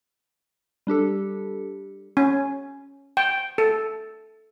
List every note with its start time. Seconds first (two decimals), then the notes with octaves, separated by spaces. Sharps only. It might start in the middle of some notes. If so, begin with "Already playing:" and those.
0.87 G3 D4 G4 A4
2.17 C#4
3.17 G5
3.58 A4